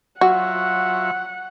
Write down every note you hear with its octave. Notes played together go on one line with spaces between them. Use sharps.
F#3 F4 F#4 E5 F#5